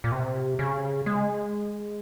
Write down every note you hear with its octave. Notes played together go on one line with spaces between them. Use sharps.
A#2
C3
C#3
G#3